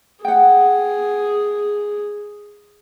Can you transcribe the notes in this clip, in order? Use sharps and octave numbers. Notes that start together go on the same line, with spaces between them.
G#4 F#5 G5